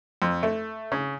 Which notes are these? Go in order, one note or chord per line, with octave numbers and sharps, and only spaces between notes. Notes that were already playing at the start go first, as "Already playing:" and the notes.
F2
A3
C#3